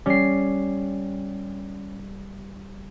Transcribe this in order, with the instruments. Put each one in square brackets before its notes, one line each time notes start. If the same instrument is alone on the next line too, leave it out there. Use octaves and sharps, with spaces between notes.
[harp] G3 C7 [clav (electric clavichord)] C#4